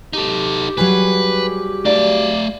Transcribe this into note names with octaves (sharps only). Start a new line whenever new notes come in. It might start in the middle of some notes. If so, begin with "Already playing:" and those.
D#4 G4 A4
F#3 G3 G#4 B4
A3 D5 F5